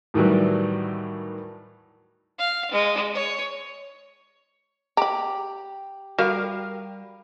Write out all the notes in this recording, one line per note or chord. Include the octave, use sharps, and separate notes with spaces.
A2 D#3 E3 F#3 G3
F5
G#3
C#5
G4 A#5 B5
G3 F#4 A#4 F5